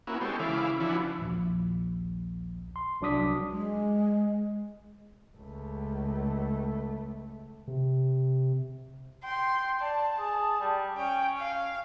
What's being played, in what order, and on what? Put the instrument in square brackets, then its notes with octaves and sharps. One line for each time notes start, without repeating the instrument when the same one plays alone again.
[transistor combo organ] A#3 B3 C#4 E4 F#4
G#3 G4 A4 C5 C#5
C#3 E3 E4 F5 D6
E3 F3 C#4 D4 E4 F#4
[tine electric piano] A#1 D#2
C6
C2 F#3 D4 D6 D#6 B6
[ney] G#3
[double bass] C#2 A3
[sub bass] C3
[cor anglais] G5 [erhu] C6
[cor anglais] D5 [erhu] A5
[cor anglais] G#4
G3
[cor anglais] C#4 [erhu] G5
[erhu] F5